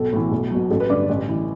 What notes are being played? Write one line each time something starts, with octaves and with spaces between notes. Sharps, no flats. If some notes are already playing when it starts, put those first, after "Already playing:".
Already playing: B1 A4
A2 E3
B1
B2 F#3
A1 A4
B4
G2 D3 D5
A1
E3